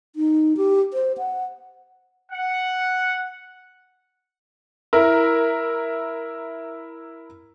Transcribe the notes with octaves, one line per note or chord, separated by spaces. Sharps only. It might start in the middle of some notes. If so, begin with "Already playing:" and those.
D#4
G4
C5
F#5
F#5
E4 A#4